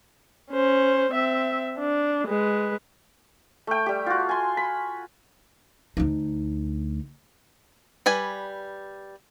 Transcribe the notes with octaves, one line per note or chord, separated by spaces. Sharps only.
C#4 C5
C4 E5
D4
G#3 B4
A3 G5
G3 G4
F4 F#4
G#5 C6
B5
D2 D#4
G3 B4 G#5